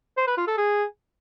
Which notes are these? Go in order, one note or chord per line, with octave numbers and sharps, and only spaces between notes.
C5
B4
F4
A4
G#4